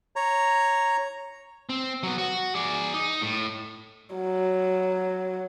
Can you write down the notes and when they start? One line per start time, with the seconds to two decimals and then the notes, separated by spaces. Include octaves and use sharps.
0.16 C#5 A#5
1.69 C4
2.03 F#3 B3
2.18 F#4
2.55 G#4 D5
2.94 D#4
3.22 A2
4.15 F#3